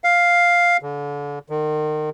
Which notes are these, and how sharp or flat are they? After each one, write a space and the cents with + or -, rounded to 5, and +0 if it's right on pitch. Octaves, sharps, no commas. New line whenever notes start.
F5 +0
D3 -35
D#3 -35